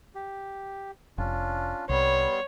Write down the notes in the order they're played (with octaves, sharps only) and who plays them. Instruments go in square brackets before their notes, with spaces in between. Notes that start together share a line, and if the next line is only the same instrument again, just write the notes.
[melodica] G4
[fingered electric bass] F1 [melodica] C#4 D4 F4
[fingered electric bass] C2 [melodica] G3 B3 C6 [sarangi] C#5